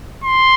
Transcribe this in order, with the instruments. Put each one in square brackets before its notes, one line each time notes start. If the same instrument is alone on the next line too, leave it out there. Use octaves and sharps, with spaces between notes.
[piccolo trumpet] C6